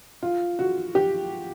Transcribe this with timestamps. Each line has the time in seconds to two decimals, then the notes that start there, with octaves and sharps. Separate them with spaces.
0.23 F4
0.59 F#4
0.95 G4